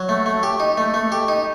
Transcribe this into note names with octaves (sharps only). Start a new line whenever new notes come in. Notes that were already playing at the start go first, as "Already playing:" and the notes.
Already playing: F#3
A3
A3
G4
D#4
A3
A3
G4
D#4